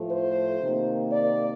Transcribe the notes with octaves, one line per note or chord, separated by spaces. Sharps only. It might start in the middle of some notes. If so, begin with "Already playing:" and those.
Already playing: A2 F3 A3
C5
C3 D#3 A#3
D5